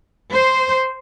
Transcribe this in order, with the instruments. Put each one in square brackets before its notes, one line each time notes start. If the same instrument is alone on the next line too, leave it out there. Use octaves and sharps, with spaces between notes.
[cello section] C5